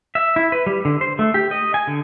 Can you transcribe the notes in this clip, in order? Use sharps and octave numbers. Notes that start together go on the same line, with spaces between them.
E5
E4
B4
G3
D3
C5
A3
G4
D#5
G#5
D3